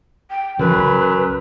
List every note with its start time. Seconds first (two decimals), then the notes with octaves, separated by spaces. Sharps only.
0.31 G5
0.59 F#2 C#3 E3 F3 B4
0.75 C2 C#3